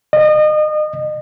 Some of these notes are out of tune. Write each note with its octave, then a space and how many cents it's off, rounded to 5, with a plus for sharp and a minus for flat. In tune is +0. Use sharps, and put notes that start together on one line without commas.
D#5 -30